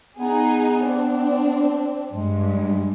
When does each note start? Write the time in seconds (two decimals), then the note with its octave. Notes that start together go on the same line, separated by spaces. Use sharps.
0.18 B3 D#4 G#4
0.86 C4 D4
2.12 G2 G#3